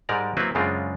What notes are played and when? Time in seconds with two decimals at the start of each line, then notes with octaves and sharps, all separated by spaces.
0.09 G#2 G3 G#3 A#4 D5 A#5
0.37 F#3 A#3 C4 E4 B4 E5
0.55 F#2 C#3 G#3 C4 D4 F4